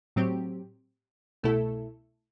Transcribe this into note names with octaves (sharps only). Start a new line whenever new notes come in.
A2 F#3 C4 G4
C2 B2 A3 E4 A4